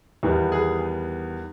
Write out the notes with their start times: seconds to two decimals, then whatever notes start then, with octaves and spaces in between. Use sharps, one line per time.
0.23 E2 D#3 G3 B3
0.52 G#4